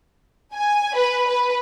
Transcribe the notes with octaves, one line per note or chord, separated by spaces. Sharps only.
G#5
B4
B4